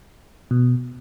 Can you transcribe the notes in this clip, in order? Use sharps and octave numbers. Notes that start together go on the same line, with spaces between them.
B2